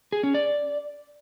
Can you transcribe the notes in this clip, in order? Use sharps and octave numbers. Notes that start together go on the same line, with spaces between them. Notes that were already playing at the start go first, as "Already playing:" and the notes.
G#4
C#4
D5